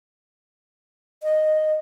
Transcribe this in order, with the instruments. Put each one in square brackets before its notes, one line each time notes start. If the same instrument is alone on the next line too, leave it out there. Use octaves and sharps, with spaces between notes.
[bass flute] D#5